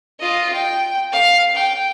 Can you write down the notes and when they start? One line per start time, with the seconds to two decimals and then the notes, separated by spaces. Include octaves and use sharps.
0.20 F4 D#5
0.53 G5
1.12 F5
1.54 G5